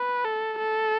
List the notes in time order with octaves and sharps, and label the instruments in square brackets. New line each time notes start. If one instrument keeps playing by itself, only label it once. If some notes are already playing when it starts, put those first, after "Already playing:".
Already playing: [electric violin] B4
A4
A4